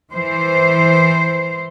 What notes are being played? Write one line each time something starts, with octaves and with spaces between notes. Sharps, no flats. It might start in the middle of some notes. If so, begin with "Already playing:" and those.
E3 C5